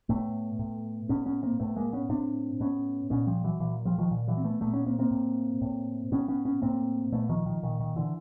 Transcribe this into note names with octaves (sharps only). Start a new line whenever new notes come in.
A2 A3 B3
A2
A2 B3 C#4
B3 C#4
A#3 C4
A2 A3 B3
G#3 A#3
B3 C#4
A2 C4 D4
A2 B3 C#4
A#2 B3 C#4
F3 G3
E3 F#3
A#2 E3 F#3
F3 G3
D#3 F3
A#2
E3 F#3
C4
A3 B3
A#2 A3 B3
B3 C#4
A#3 C4
A#3 C4
A2
A2
A2 B3 C#4
B3 C#4
B3 C#4
A2 A#3 C4
A#2 A3 B3
D#3 F3
D#3 F3
A#2 D#3
D#3
D3 E3